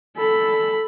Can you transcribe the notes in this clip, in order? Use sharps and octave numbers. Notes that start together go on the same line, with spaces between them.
A4 B5